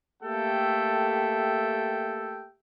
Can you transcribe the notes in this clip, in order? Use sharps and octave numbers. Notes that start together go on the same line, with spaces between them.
A3 A#3 G4 A4 E5 G5